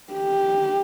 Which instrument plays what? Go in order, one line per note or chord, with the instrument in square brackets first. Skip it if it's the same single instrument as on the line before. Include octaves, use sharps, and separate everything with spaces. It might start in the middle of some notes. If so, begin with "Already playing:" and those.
[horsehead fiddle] G4